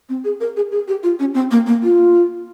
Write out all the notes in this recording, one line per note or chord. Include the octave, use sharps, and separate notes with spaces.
C4
G#4
A#4
G#4
G#4
G4
F4
C#4
C4
A#3
A#3
F4